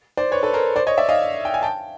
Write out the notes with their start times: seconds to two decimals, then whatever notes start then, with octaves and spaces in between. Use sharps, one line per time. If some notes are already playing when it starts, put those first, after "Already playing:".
0.17 C5 D5
0.31 B4 C#5
0.43 A4 B4
0.54 A#4 C5
0.76 C5 D5
0.87 C#5 D#5
0.98 D5 E5
1.09 D#5 F5
1.45 G5
1.54 G#5
1.63 G5 A5